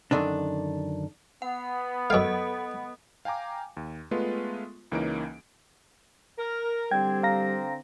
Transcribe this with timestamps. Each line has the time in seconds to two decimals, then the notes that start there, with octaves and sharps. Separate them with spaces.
0.11 F#2 A2 D3 D#3 D4
1.42 B3 F#5
2.10 F#2 A4 D#5 F5
3.25 F5 G5 G#5 A#5 D6
3.77 D#2
4.11 G#3 A3 B3 F4 B4
4.92 C#2 E3 A#3 C#4 D#4 D7
6.38 A#4
6.91 D3 G3 C4 G5 G#6
7.23 F5 A#5 A#6